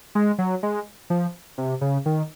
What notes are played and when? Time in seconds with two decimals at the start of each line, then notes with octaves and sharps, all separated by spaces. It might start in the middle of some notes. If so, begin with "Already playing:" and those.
0.15 G#3
0.38 F#3
0.63 G#3
1.10 F3
1.58 C3
1.81 C#3
2.06 D#3